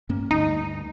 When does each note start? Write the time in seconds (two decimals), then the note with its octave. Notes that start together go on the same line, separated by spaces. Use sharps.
0.09 G2 A#3 C#4
0.31 D2 G2 D#4